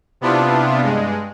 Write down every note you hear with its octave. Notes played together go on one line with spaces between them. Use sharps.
C3 B3 D4 E4 F4
G2 G#3